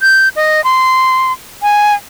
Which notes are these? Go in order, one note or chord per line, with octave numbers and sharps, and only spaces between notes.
G6
D#5
C6
G#5